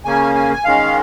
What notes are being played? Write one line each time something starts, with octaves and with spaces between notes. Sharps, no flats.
C#3 A#3 C#4 G#5
G#5
G#5
D#3 G#3 C#4 F5